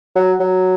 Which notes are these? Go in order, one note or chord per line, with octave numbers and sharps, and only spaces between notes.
F#3
F#3